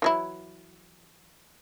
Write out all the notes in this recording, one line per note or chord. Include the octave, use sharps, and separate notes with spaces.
E3 F#3 E4